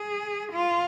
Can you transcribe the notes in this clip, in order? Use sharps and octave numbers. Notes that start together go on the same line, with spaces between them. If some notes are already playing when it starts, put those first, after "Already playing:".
Already playing: G#4
F4